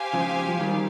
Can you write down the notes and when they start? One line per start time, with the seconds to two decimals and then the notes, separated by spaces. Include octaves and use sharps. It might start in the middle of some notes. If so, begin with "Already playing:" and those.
Already playing: G4 C5 F5 G#5
0.14 C#3 F3
0.49 F3
0.61 D#3 G3